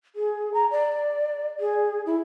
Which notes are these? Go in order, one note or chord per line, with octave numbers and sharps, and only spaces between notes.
G#4
A#5
D5
G#4
E4